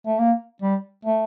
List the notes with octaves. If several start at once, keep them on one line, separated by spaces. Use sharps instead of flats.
A3
A#3
G3
A3